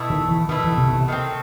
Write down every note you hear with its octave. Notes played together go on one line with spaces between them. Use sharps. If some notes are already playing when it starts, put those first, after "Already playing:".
Already playing: B2 A3 E4
D#3
E3
B2 D#3 A3 E4
E3
C3
C3
D#3 A3 C4